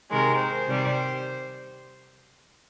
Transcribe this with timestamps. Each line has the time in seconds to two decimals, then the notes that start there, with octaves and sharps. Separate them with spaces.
0.10 C3 D#3 G#3 A#4
0.38 C5
0.67 C3 D#3 G3